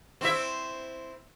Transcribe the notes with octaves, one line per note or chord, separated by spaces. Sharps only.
C4 E4 E5